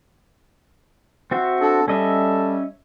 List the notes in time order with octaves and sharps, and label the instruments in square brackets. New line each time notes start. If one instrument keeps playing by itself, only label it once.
[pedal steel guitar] C4 F#4 E5
[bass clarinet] D4 [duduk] A4
[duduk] G3 [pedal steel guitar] C#4 D#5 E5 [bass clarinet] A4